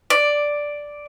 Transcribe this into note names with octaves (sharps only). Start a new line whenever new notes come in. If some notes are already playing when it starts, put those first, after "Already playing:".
D5